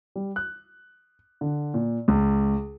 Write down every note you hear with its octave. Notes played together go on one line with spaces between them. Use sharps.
G3
F#6
D3
A#2
C#2